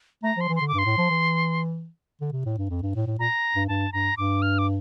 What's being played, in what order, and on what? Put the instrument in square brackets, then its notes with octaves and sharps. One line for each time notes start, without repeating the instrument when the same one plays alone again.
[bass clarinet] A3 [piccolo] A#5
[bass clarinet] F3
[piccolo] C6
[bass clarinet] E3
[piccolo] C6
[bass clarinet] D3
[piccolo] D6
[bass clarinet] G2
[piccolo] C6
[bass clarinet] A2
F3
E3
D3
C3
A2
G2
F2
G2
A2
A2
[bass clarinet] A#2 [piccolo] A#5
[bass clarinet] G2
[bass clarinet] G2 [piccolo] A5
[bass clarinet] G2 [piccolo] A#5
[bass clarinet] G2 [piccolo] D6
[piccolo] F6
D6